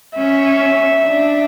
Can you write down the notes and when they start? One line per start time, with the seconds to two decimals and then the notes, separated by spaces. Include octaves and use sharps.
0.17 C#4 E5
1.05 D4